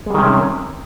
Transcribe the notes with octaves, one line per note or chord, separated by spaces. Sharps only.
C3 D#3 G3 G#3 C#4